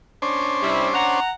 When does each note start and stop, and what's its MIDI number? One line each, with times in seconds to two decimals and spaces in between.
0.22 1.20 61
0.22 1.20 62
0.22 1.20 72
0.62 0.88 48
0.62 0.88 55
0.62 0.88 64
0.94 1.31 78
0.94 1.31 82